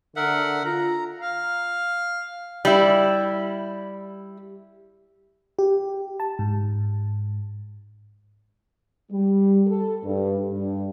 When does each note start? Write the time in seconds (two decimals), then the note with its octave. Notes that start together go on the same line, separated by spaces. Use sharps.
0.16 D3 A#4 E5 F#5
0.65 F4 A#5
1.20 F5
2.65 G3 E4
5.59 G4
6.20 A5
6.39 G#2
9.11 G3
9.66 A4
10.03 G2
10.50 G2